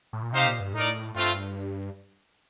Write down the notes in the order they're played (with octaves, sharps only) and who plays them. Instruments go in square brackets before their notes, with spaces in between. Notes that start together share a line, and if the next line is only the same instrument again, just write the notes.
[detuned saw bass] A2
A#2
[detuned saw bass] C3 [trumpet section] D#4 G4 C5 F5
[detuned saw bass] A#2
G2
[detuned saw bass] A2 [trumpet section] D#4 A#4 D5
[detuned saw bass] G2 [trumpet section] A3 C4 F4